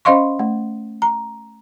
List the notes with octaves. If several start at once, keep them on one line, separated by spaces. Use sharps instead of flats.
C#4 C5 D#5 F5 C6 C#6
A3
A#5